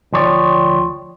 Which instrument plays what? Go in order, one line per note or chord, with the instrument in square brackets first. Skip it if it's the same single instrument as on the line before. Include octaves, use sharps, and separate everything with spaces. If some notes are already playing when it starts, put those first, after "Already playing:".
[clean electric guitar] D2 F3 C#5 D5 G5